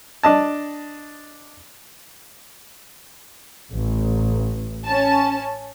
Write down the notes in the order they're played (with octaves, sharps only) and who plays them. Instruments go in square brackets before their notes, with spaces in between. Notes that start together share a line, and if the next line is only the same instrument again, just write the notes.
[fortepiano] D4 D#5 A5
[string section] A1
C#4 A5